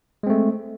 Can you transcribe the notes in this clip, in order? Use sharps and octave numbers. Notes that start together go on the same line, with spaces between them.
G#3 A3 C4